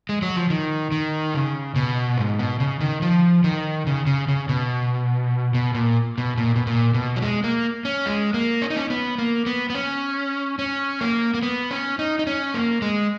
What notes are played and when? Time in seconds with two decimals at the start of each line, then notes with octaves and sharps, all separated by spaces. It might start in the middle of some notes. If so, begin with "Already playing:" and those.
0.09 G#3
0.22 F#3
0.36 F3
0.50 D#3
0.92 D#3
1.34 C#3
1.76 B2
2.18 G#2
2.39 B2
2.60 C#3
2.80 D#3
3.02 F3
3.44 D#3
3.87 C#3
4.06 C#3
4.28 C#3
4.49 B2
5.54 B2
5.75 A#2
6.18 B2
6.38 A#2
6.56 B2
6.67 A#2
6.94 B2
7.16 F#3
7.22 G#3
7.44 A#3
7.85 C#4
8.06 G#3
8.34 A#3
8.62 C#4
8.70 D#4
8.77 C#4
8.90 B3
9.18 A#3
9.46 B3
9.70 B3
9.75 C#4
10.59 C#4
11.01 A#3
11.34 A#3
11.43 B3
11.71 C#4
11.99 D#4
12.19 D#4
12.27 C#4
12.54 A#3
12.82 G#3